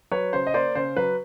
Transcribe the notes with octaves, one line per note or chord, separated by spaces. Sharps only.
F#3 B4 C#5
C#3 C5
D#5
A#3 C5 D5
C#3 C5
F#3 B4